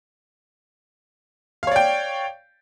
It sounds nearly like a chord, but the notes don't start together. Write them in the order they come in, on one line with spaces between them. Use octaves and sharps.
F5 C#5 D5 G5